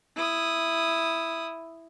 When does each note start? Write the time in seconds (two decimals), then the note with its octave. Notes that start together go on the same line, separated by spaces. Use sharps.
0.16 E4 D#6